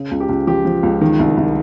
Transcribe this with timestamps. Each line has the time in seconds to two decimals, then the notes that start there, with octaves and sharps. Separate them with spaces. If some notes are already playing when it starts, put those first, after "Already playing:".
Already playing: C#3
0.11 C#2
0.20 G4
0.29 C#2
0.47 F3 G4
0.65 F3
0.83 C#2
1.01 D#3
1.19 C2
1.37 C2